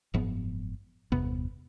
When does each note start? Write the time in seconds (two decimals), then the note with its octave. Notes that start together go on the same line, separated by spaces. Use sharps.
0.14 F#1 G#2 F3 B3
1.12 G1 E2 C3 B3